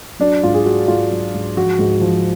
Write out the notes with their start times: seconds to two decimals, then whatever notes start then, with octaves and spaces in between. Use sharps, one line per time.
0.20 F#3 D4
0.43 G#2 F4
0.54 G#4
0.65 F#3 F#4
0.88 G#2 F4
1.11 F#3
1.34 G#2
1.57 F3 F#4
1.79 G#2
2.01 F3